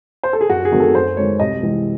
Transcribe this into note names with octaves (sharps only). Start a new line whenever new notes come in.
C5
A4
G#4
F#2 F#4
G#4
D#3 F#3 A3 C4
A4
F#2 C5
D#3 G#3 C#5
C2 D#5
C3 E3 G#3 C4